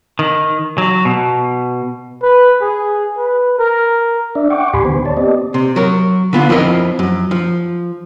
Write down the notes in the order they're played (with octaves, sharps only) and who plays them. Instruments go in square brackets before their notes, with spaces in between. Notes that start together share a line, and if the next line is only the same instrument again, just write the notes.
[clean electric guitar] D#3
F#3
B2
[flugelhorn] B4
G#4
B4
A#4
[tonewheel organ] D4 D5 E5
F#5 G5 C#6 D6
D#2 A2 G4 G#5 B5 C6
D3 D#3 B3 C5
C#5 D5 A5
B3 C4 G4 D5 D#5
[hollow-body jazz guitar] C3
F#3 A#4
D3 B3 F4
F2 F3 C4 E4 A#4 D#5
F#2
F3